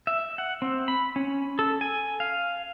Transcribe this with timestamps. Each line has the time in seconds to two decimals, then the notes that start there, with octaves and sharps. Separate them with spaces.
0.07 E5
0.38 F#5
0.62 C4
0.88 B5
1.16 C#4
1.59 A4
1.81 G#5
2.20 F5